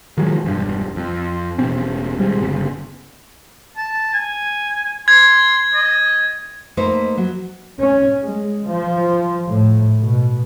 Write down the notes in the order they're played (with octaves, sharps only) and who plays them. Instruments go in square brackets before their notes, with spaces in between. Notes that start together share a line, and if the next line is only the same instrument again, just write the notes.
[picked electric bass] D#3 F3 F#3 G#3
E1 G2
F2
E1 B2 C4 C#4
D#1 G3 G#3 C4
G1 C#3
[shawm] A5
G#5
[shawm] C6 [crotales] G#6
[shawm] D#5
[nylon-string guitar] A3 A#3 D#4 B4 C5
F#3
[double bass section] C#4
G#3
F3
A2
B2